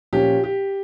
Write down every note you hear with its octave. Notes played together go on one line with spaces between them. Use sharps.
A#2 F3 C#4 G4
G4